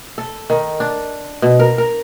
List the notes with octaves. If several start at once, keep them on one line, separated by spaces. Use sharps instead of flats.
A4
D#3
D4
B2
A#4
A#4